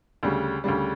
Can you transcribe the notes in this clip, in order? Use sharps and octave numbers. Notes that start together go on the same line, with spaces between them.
D2 C#3 G3
D2 C#3 G3